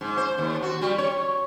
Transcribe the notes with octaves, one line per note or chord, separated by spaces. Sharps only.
G#2
C5
D#2
F#4
G3
C#5